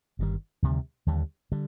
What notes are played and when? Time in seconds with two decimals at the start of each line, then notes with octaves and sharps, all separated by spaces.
0.19 G1 G2 D#3 G3
0.62 D2 C3 D#3 G3
1.07 D#2 D3 G3
1.52 D3 G3